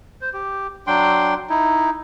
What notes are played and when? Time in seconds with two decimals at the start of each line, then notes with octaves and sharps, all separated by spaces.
0.21 C5
0.33 G4
0.87 F#3 D4 G5 C6
1.50 D#4 E4